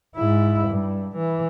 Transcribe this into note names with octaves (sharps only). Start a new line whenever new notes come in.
G#2 E4
G2
E3